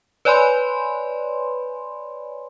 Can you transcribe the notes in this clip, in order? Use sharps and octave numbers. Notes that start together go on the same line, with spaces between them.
B4 C#5 D5 G#5 B5 C6